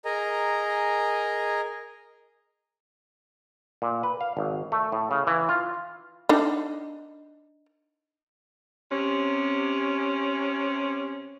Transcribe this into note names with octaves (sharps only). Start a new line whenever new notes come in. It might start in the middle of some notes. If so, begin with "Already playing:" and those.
G#4 A#4 D#5 G#5 A#5
A#2
B4
F5
G#1
A3
A2
C#3
E3
F4
D4 D#4
C3 C#4